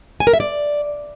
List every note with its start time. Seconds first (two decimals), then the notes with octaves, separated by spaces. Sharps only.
0.20 G#5
0.27 A#4
0.33 E5
0.40 D5